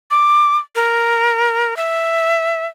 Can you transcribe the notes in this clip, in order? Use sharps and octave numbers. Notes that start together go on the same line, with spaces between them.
D6
A#4
E5